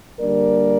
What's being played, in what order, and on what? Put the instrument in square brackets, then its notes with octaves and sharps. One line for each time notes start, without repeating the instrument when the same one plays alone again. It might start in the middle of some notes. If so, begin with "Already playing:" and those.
[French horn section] D3 G3 A#3 D4 A#4 D5